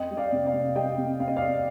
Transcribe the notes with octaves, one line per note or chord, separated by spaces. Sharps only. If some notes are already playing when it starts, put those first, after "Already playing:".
Already playing: F2 D#5 G5
G3
D5 F5
C3
D5 F5
C3
G3 D#5 G5
C3
C4 F5
D#5
F2 D5 F5